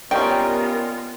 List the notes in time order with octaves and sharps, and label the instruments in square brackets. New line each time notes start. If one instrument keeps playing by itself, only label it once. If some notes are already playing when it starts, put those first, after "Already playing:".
[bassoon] G3 [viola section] B3 F4 A#4 [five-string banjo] C#4 D#4 [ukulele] G5